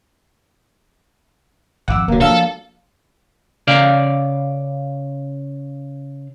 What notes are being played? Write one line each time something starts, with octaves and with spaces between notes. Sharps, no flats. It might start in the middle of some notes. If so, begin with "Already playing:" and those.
G#1 F2 F#5 D6 E6
D1 D3 F#3 A#3
E3 F3 D4 A4 F5 A5
C#3 D5 F5